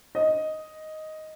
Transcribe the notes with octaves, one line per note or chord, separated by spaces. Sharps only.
D#5